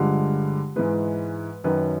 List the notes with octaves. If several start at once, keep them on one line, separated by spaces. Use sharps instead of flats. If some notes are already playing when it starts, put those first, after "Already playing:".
Already playing: G2 D3 F3 G#3
G#2 E3 G#3 B4
F#2 D#3 F#3 B4